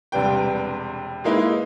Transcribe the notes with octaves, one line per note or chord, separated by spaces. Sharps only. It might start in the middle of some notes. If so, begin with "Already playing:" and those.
E1 C3 G3 D4 B4 G5
G#3 A#3 D#4 E4 B4